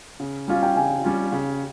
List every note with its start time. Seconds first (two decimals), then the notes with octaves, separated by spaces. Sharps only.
0.20 C#3
0.48 G3 C#4 F4 F5
0.63 G5
0.76 C#3 G#5
1.04 G3 C#4 F4
1.32 C#3